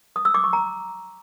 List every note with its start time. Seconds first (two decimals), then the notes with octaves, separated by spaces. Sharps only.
0.16 D#6
0.25 E6
0.34 D6
0.44 C#6
0.53 A#5